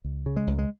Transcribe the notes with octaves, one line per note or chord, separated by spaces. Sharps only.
C#2
C#3
G#3
C#2
G#3